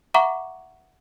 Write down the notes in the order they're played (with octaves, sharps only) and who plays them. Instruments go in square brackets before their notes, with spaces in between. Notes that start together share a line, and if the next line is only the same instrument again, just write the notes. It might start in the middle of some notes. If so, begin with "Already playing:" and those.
[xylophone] E5 F#5 A#5 C#6 D6